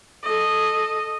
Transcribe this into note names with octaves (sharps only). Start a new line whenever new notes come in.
A4 D#5